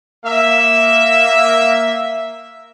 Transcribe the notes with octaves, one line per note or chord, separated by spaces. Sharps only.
A#3 E5